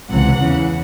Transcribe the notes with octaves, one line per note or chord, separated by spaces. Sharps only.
C#2 C3 E3 F#5
E2 C#3 E3